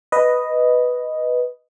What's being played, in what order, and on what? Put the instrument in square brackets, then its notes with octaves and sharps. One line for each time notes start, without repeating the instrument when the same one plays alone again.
[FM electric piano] B4 D#5